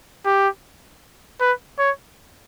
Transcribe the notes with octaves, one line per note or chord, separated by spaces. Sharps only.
G4
B4
C#5